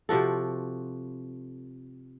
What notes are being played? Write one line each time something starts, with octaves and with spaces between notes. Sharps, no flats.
C3 F3 F#4 A4